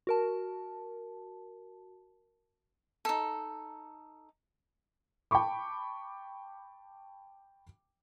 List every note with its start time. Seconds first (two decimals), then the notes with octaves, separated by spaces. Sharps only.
0.07 F#4 A#4 A5
3.05 D#4 A4
5.31 G5 A5 B5 C#6 D6